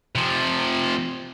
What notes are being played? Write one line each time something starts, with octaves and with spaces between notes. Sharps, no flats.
C3 F3